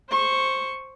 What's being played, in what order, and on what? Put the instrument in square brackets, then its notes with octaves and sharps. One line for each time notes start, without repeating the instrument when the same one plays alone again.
[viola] C5 C#6